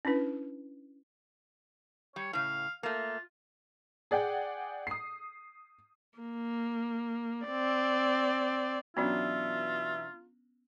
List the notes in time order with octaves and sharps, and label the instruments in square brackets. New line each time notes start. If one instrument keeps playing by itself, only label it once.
[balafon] C#4 D4 E4 B4
[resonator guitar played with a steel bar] G3 [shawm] C#5
[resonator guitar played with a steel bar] A2 C#3 [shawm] F5
[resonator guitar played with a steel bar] A3 A#3 [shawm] F4
[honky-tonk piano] G#4 D5 F#5 G5
D#6 C7
[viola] A#3
C4 D5
[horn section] B2 E3 E5 [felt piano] F#3 D4 [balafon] B3 C#4 [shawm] F4